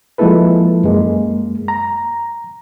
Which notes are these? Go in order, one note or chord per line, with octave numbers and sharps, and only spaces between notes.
F3 G#3 A#3 E4 A4 B4
F#2 G#3 A#3
A#5